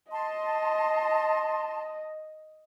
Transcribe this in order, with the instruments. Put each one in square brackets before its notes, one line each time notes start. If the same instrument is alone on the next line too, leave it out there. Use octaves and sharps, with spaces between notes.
[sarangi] D#5 [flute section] A5 C6